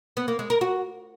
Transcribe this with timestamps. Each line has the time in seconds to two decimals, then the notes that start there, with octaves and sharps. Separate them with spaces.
0.17 B3
0.28 A#3
0.39 G#3
0.50 A#4
0.61 F#4